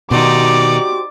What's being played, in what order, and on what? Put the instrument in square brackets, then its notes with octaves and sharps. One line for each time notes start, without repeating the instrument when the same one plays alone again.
[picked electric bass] B2 D#3 [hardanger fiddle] D#4 D5 [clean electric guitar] F#4 G4 C5 [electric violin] D6